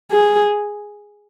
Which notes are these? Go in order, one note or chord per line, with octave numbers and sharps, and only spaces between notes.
G#4